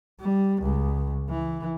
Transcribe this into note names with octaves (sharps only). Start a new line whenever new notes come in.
G3
C#2
E3